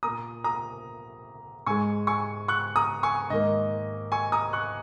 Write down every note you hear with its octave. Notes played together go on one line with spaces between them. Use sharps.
A#3 A#5 D#6
A#2
A#5 D#6
G#2 G#3 G#5 C#6
G#5 C#6
C#6 F#6
A#5 D#6
G#5 C#6
G#2 D#3 A#3 D#5
G#5 C#6
A#5 D#6
C#6 F#6